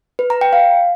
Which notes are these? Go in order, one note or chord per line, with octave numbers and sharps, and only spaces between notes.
B4
A#5
G5
F5